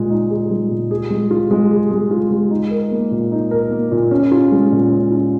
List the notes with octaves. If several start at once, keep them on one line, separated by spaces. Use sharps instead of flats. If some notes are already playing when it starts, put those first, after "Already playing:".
Already playing: A#2 G#3 G#4
D#4
G#4
G#3
A#2
G#4
G#3
F4
G#3
G#4
G#3
F4
G#3
D#4
A#4
A#3
A#2
D#4
A#4
A#3
A#2
C#4
F4
G#3
A#2
C#4
F4